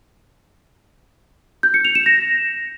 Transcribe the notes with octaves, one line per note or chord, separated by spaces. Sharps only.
G6
C#7
F7
E7
A#6